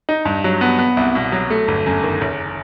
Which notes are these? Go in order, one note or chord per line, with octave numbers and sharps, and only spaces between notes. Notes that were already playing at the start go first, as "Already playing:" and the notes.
D#4
G2
F#3
B3
B3
C2
B2
F#3
A3
G1
F#2
D#3
F#1